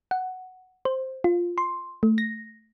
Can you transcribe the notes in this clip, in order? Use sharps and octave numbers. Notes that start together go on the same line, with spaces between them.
F#5
C5
F4
C6
A3
A#6